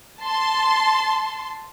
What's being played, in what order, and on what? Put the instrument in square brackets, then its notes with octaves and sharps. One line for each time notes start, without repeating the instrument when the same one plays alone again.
[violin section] A5 C6